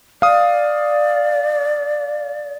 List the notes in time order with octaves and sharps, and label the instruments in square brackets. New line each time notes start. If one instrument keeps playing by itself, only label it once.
[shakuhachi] D5 [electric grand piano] F5 D#6